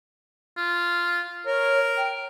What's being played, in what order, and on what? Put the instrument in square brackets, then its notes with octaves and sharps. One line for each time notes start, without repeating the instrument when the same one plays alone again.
[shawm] F4
[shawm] A#4 [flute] C#5
[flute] G5